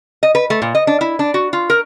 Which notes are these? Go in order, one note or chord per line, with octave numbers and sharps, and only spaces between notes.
D#5
B4
A3
A#2
D#5
D4
E4
D4
F#4
F4
A#4